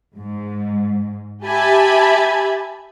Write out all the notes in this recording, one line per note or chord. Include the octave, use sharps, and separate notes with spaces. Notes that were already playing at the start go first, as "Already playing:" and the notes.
G#2
G4 E5 G#5 A5 B5